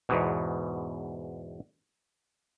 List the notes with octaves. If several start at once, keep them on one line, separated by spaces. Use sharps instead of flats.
E2 G#2 B2